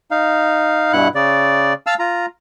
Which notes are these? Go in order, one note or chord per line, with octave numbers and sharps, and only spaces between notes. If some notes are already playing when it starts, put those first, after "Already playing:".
D#4 F5
G2 B2 E4 F#5 F#6
C#3 D5
F5 A5 E6 F6
F4 A#5